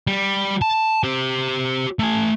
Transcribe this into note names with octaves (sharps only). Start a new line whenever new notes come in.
G3
A5
G4 C5
A3 G#5